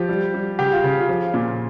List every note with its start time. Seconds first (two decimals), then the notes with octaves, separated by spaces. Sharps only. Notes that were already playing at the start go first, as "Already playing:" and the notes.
Already playing: F3 G4
0.09 G3
0.34 G3
0.59 C#3 G4
0.73 F4
0.84 C#3
1.00 F4
1.09 F3
1.34 A#2